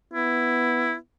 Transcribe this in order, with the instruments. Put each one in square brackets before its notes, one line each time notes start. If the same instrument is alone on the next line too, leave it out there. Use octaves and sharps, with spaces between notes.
[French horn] B3 [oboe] E4